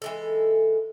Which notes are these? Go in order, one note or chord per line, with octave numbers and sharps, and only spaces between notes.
E3 G#3 A4